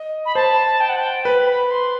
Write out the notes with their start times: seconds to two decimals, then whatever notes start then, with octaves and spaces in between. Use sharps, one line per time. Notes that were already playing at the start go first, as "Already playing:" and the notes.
Already playing: D#5
0.26 B5
0.35 C5 A5
0.81 G5
0.89 F#5
0.98 G5
1.25 B4 B5
1.48 B5
1.71 C6